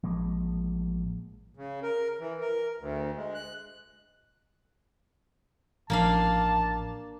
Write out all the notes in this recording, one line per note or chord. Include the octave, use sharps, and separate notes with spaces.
A1 F3 G#3 A#3
C#3
A#4
E3
A#4
D2
G#3
F#6
A1 F3 A#3 D4 F5 A5